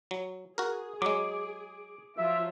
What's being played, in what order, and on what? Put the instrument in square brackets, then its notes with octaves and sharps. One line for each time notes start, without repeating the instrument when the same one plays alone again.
[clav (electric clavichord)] F#3
[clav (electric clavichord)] F#4 A#4 [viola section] G#4
[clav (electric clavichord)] F#3 G#3 [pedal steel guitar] D6
[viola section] F3 F#3 F4 [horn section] E5